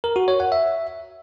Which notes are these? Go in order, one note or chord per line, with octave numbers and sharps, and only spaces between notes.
A#4
F#4
C#5
F#5
E5